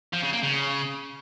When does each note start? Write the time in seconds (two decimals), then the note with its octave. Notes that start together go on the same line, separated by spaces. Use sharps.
0.13 F3
0.23 C#3
0.33 A#3
0.43 C#3